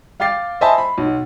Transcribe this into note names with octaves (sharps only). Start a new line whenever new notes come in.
F5 G5 D6 A6 C7
C5 D#5 E5 G#5 A5 B5
B5
B1